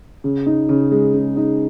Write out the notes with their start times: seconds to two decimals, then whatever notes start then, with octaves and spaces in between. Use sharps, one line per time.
0.24 C#3
0.46 D#4
0.69 C#3
0.92 G#3
1.14 C#3
1.37 D#4